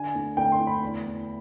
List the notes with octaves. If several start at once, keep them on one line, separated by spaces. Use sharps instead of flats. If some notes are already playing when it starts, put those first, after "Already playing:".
Already playing: D3 G#5
D2
D2 G5
C6
D2
B5
E2
E2